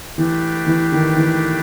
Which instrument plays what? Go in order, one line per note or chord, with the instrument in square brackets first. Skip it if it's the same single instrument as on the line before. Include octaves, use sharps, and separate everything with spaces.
[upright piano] E3 [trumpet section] A3 D4 G4 B4
[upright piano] E3
D#3
E3